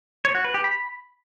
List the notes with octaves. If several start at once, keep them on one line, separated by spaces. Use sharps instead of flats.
C#5
F#4
B4
G4
B5